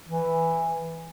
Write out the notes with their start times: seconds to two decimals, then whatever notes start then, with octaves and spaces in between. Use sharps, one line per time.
0.07 E3